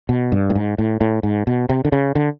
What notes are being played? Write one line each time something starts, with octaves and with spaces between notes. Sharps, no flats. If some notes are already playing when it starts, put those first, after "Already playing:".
B2
G2
A2
G#2
A2
A2
G#2
B2
C3
D3
C#3
D3